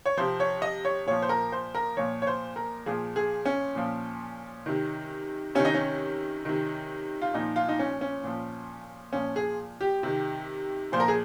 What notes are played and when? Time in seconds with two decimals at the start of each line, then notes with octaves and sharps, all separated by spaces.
0.06 C#5
0.17 C3 F3 C5
0.40 C#5
0.62 D#5
0.85 C#5
1.07 A#2 F3 C#5
1.22 C5
1.29 A#4
1.52 C5
1.75 A#4
1.97 A#2 F3 C#5
2.22 C#5
2.27 C5
2.56 A#4
2.86 A#2 F3 G#4
3.16 G#4
3.45 C#4
3.75 A#2 F3
4.66 C3 D#3
5.55 C3 D#3 C#4
5.65 D#4
5.74 C#4
6.45 C3 D#3
7.22 F4
7.34 A#2 F3 D#4
7.56 F4
7.68 D#4
7.79 C#4
8.01 C#4
8.24 A#2 F3
9.13 A#2 F3 C#4
9.36 G#4
9.81 G4
10.03 C3 D#3
10.92 A#2 F3 C5
11.00 A#4
11.08 G#4